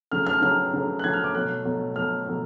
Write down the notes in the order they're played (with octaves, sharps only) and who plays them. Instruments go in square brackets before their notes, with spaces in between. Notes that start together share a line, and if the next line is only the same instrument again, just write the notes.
[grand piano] C#3 F#3 A3 F6
F6
C#3 F#3 A3 F6
C#3 F#3 A3
F#6
C#3 F#3 A3 G#6
F6
D6
B2 F#3 A3 F#6
B2 F#3 A3
B2 F#3 A3 F6
B2 F#3 A3